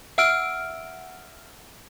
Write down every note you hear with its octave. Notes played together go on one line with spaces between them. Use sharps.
E5 F#5 E6 F6 D7